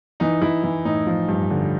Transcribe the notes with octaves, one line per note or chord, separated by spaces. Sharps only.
E3 D#4
E3 E4
E3
A2 D#4
F3
G2
D3